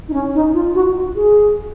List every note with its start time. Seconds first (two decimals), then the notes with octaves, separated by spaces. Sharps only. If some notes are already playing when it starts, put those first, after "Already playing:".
0.09 D#4
0.13 C#4
0.35 D#4
0.54 F4
0.75 F#4
1.16 G#4